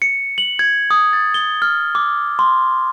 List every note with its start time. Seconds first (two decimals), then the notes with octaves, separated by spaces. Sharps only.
0.02 C#7
0.38 F#7
0.59 G#6
0.91 D#6
1.13 A6
1.34 G7
1.62 F6
1.95 D6
2.39 C6